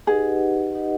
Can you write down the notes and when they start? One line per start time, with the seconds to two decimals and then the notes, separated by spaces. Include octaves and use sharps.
0.07 D#4 G4 G#4 B4 D#5 F#5
0.74 D#4 G4 B4 D#5 F#5